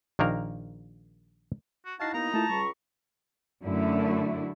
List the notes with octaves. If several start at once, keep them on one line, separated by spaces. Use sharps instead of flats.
A#1 D#3 A#3 A#4 A#5
F#4
D#4 E4 F#4 F5 A5 F6 C7
D#2 A#3 B3 D#4 F5 A#5
A3 E4 F4 A5
C#2 G3 B5 C#6
F#2 D3 A3 E4